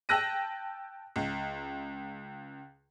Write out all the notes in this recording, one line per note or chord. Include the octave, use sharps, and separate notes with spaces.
G5 A5 E6 F#6 A#6 D#7
C#2